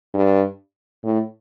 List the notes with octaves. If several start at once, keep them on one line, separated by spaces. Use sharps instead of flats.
G2
A2